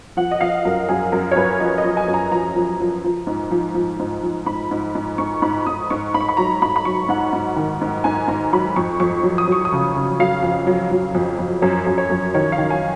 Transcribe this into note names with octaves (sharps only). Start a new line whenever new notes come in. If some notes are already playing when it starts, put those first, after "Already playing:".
F3 F#5
D#5
F3 F5
F#2 A#4
F#2 G#4
F#2 A#4
C#5
F#2 B4
F3 D#5
D#5
F3
G#5
F#2
A#5
F3 A#5
F3
F3
F3
G#2
F3
F3
G#2
F3
G#2 B5
G#2
G#2
G#2 C#6
G#2 B5
G#2 D#6
G#2 C#6
G#2 B5
C#6
B5
F#3 A#5
G#2 B5
B5
F#3 C#6
G#2 F#5
G#2
D#3
G#2
G#2 G#5
G#2 A#5
F#3 B5
F2 C#6
F2 C#6
F#3
D#6
F#3 C#6
D#6
C#3
C#3
F#3 F5
F2
F#3
F#3
F2
F2
F#2 C#5
F#2
C#5
F#2
D#3 C#5
F5
D#3
G#5